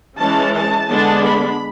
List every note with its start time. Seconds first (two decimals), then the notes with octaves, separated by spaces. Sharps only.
0.18 E3 G#3 C#4 A5
0.53 A5
0.88 D3 G#3 B3 D4 A5
1.23 B5